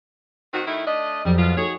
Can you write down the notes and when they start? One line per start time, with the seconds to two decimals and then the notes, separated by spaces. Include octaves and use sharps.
0.54 D#3 C4 F#4
0.67 D#3 A3 E4
0.87 A3 D4 D#5
1.25 F2 F#3 G3
1.38 B2 G#3 F4
1.57 D#4 F#4 G#4 A4 C#5